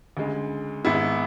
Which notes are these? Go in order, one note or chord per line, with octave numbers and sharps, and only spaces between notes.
D2 C#3 G#3
G#1 G#2 G#3 B3 E4